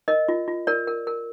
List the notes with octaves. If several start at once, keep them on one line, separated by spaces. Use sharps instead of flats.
A#4 D#5
F4
F4
A#4 D5
A#4
A#4